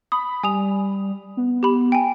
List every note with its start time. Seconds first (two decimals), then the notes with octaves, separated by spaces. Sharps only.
0.12 B5 D#6
0.43 G3 G#5 D#6 F7
1.37 B3
1.63 G4 B5
1.92 G5 G#5